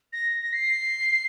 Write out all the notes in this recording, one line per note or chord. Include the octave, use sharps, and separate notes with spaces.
A#6
A#6
C7